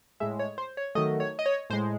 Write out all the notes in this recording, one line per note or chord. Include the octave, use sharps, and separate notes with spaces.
A2 G#3 E5
C#5
C5
C#5
D#3 F#3 A3 D#5
C#5
D#5
C#5
A2 G#3 C5